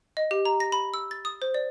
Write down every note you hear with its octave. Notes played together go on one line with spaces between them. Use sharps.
D#5
G4
A#5
A#6
B5
E6
A6
D#6
C5
D5